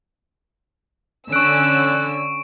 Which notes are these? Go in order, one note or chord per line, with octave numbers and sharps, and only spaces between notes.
D3 C#4 C#6 E6 F#6 D7